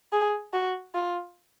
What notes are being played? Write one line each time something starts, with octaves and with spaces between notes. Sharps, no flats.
G#4
F#4
F4